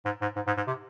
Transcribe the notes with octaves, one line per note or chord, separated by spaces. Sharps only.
G#2
G#2
G#2
G#2
G#2
C3